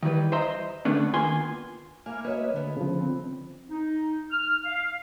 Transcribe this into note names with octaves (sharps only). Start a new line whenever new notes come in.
D#3 E3 G3 B4
C5 D#5 E5 A#5 C6
D3 A3 B3 C#4 D4
D#3 A#3 B3 F4 G#5 C6
A#3 E4 G#5 F6
A#3 F#4 B4 C#5 D#5 E5
D2 D3 B3
C#3 F3
C4
D#4
F6
F5